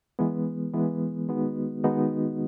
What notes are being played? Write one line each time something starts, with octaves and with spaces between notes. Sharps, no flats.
E3 G#3 B3
E3 G#3 B3
D#3 G#3 B3 D#4 F#4
D#3 G#3 B3 D#4 F#4